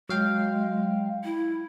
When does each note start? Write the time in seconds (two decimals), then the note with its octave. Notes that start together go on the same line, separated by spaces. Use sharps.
0.09 F#3 G#3 F5 G5
1.24 E4